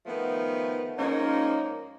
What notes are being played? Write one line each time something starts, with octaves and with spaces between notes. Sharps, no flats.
D#3 F3 A3 B3
G#2 F3 A#3 C#4 D#4